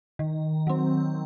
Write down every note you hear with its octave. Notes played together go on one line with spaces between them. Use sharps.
D#3
F#3 C4